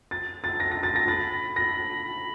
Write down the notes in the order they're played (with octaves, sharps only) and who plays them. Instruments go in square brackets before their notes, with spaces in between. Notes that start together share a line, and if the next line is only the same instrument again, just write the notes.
[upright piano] A6
A6
A#6
A#6
A6
A#6
[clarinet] B5 [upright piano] A6
[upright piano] A#6
[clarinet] B5